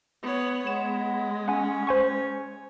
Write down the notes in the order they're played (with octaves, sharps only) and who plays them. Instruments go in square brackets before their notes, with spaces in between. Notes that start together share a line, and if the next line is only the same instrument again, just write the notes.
[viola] B3 C#5
[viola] G#3 [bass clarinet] B3 [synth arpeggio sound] E7
[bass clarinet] C#4 [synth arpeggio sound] F#5 G#5
[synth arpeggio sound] C5 G#5 C#6